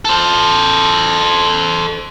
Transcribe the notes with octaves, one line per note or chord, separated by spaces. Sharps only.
A4 C5